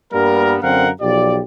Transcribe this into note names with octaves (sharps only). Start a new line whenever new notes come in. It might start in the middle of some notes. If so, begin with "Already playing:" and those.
G2 G3 A#3 B3 A#4
F#2 D3 C4 A#4 F5 F#5
B1 F3 G4 D5